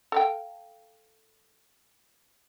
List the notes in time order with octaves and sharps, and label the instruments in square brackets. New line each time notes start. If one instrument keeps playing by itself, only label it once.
[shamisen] A4 F5 G5